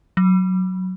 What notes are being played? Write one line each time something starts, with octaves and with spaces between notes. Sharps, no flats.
F#3